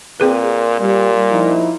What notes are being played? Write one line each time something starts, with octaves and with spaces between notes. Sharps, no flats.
A#2 C4 G#4 B4
A#2 G3
F3 D#4 E4